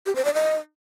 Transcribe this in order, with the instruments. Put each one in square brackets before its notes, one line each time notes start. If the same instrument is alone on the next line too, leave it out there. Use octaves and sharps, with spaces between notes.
[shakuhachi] G4
C5
D5
D#5